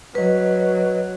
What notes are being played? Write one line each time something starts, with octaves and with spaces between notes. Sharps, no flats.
F#3 B4 D#5